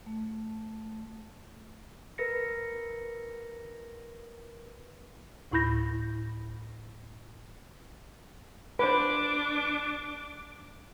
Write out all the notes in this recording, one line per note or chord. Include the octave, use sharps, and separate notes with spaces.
A3
A#4 B4 A#6 C#7
D2 A2 E4 B5 G6 A#6
D4 B4 C5 D6